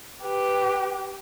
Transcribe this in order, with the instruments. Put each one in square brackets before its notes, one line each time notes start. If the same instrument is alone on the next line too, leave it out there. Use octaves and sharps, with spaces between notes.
[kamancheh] G4 B4